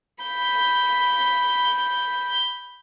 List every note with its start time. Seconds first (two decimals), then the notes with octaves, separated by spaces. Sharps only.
0.24 B5 G6